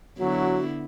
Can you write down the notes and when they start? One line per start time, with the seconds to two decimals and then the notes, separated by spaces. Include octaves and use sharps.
0.19 D3 F#3 B3 E4 F#4